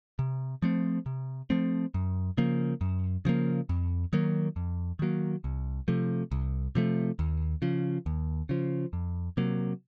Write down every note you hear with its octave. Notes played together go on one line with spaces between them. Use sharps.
C3
F3 A3 C4
C3
F3 A3 C4
F#2
C#3 F3 A#3
F#2
C#3 F3 A#3
F2
D#3 F#3 A#3
F2
D#3 F#3 A#3
C2
C3 F3 A3
C2
C3 F3 A3
D#2
C#3 F3
D#2
C#3 F3
F2
C3 F#3 A#3